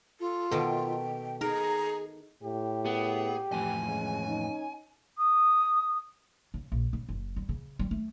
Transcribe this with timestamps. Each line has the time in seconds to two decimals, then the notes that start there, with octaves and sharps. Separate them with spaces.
0.20 F4 A4
0.51 B2 D#3 A4 G5
1.41 D#4 G#4 A#4 A#5
2.43 A2 G4
2.85 B3 G#4
3.52 F2 A2 E3 G#5
3.88 G#3 C#4
4.28 D#4
5.18 D#6
6.54 C#3
6.72 A#1
6.93 C#3
7.09 F#1
7.36 G3
7.49 C#3
7.79 G3
7.91 A3